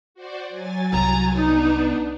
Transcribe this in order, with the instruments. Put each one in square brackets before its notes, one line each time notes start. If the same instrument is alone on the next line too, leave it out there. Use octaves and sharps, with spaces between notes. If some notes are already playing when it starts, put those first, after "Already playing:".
[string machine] F#4 C5 D5
F#3 G#5 A6
[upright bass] C2 [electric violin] A#5
[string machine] B3 D4 [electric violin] D#4